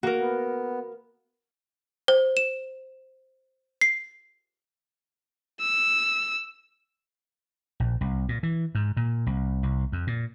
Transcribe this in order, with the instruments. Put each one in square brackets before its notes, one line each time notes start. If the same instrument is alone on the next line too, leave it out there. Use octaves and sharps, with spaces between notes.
[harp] A#3 A#4 [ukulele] F#4
[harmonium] B3
[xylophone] C5
E7
C7
[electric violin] E6
[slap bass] A#1
C2
A#2
E3
G#2
A#2
C2
C2
F2
A#2